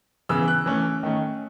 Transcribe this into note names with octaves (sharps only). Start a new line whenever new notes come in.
C#3 E3 B3 E6
F#6
E3 A3 C#4
D#3 A3 C#4